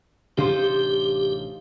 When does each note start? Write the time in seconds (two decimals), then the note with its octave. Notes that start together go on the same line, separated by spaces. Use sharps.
0.37 A1 C3 D4 D#4 F4 G4 C5